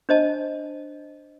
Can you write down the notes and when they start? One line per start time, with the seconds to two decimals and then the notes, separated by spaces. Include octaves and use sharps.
0.09 D4 C5 D#5 A5